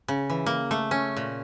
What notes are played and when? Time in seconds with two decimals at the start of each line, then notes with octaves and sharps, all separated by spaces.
0.08 C#3
0.30 E3
0.46 A#3
0.71 A3
0.91 C#4
1.16 A#2